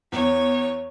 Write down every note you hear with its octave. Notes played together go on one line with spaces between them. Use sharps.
E2 C#5